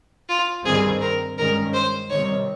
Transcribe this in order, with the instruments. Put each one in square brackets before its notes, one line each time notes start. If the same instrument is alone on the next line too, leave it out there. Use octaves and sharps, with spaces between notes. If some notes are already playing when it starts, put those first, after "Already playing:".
[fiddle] F4
[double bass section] G2 D#3 G3 C4 [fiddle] G#4
[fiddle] A#4
[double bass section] G2 D#3 G#3 C#4 [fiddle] A#4
[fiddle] C5
[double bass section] C3 D#3 G3 C4 [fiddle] C#5